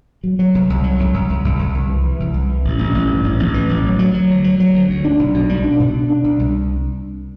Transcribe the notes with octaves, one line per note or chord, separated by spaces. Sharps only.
F#3
F#3
C2
C2
F#3
C2
C2
C2
C2
C2
C2
E3
E3
C2
C2
E3
A1
A1
A1
G2
A1
A1
E3
A1
F#3
F#3
F#3
D2
F#3
F#3
D2
D2
D4
B1
B2
G3
D4
B2
D4
D4
C2
C2